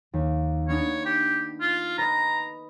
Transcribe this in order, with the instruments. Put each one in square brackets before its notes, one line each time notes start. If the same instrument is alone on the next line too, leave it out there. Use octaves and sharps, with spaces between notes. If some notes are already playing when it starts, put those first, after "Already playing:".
[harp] D#2
[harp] B3 D4 D#4 [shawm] C#5
[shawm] G4
F4
[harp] B4 D#5 [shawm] A#5